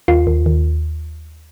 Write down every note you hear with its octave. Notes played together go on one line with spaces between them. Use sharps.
D#2 F4
D#2
D#2